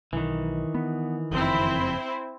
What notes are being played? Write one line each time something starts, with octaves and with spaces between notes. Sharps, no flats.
B1 D#3 E3
B3
F#1 F2 C4 E4